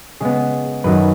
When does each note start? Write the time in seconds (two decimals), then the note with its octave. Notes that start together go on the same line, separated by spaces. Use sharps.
0.21 C#3 G#3 B3 G#4
0.84 F#2 D#3 F#3 B4